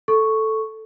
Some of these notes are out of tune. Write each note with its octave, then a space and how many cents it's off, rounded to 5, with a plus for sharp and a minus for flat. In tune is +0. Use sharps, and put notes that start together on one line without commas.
A4 +0 C#6 +0